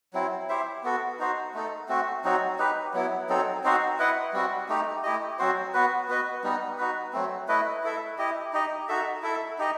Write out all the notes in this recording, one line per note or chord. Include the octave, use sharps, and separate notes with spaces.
F#3 C4 E4
E4 G4 C5 E5
B3 F#4 A4
D#4 F#4 C5
A3 D#4 A4
A3 C4 F#4
F#3 C4 D#4 F#4
D#4 G4 B4
F#3 B3 E4
F#3 C4 D#4 A4
C4 D#4 F#4 C5
E4 B4 D#5 F#5
G3 C4 F#4
A3 D#4 G4
A3 E4 G4 D#5
F#3 C4 F#4 C5
B3 F#4 B4
B3 F#4 B4 D#5
G3 B3 D#4
D#4 F#4 B4
F#3 A3 C4
A3 E4 B4 D#5
E4 A4 E5
E4 G4 D#5
D#4 G4 D#5
D#4 F#4 A4 E5
E4 A4 E5
D#4 G4 D#5